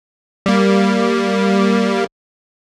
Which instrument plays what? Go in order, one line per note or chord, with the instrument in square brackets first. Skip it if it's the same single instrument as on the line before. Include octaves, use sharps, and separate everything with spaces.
[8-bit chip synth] G3 A#3